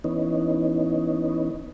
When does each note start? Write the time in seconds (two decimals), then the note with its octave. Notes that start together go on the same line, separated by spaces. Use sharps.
0.04 E3 B3 C#4 D#4